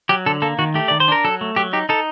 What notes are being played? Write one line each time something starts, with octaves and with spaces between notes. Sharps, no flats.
F#3 G4
D3 A4
A#3 A4
D#3 F#4
A3 G4
D#3 D5
C5
D4 A#4
F#3 A4
A3
F#3 G4
D#4 G4
D#4 A4